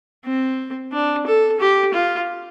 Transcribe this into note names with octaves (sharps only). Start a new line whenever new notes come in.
C4
D4
A4
G4
F4